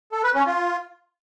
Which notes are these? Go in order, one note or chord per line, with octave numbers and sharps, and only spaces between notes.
A4
B4
C#4
F4